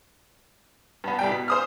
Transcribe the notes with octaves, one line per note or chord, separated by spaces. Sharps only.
G2 B3
C2 G3 G5
B2 B6
C5 D#6 F6